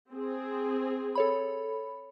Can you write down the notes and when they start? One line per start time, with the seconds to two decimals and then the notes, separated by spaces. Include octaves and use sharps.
0.11 C4 G#4
1.15 A4 C#5 B5